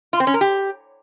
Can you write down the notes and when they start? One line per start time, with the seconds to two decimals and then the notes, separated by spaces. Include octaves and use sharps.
0.13 F4
0.20 C4
0.27 C#4
0.34 A#4
0.41 G4